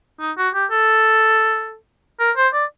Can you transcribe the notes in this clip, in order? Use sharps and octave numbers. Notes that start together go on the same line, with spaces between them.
D#4
F#4
G4
A4
A#4
C5
D5